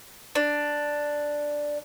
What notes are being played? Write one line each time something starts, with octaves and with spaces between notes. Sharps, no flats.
D4